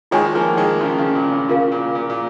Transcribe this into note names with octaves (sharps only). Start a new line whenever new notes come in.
D#3 G#3 F4 C#5 G#5 C#6
F3 A#3
D#3 G#3
C#3 F3
C#3
A#2
C#3
C#3 F4 A#4 F5
A#2
A#2
A#2